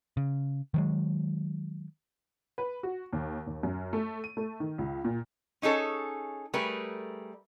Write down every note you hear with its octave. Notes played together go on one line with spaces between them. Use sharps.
C#3
D#3 F#3 G#3
B4
F#4
D#2
D#2
F#2
A3
D#7
A3
D#3
C#2
A#2
C#4 D#4 G#4 A4 C#5
G3 A3 G#4 A#4 B4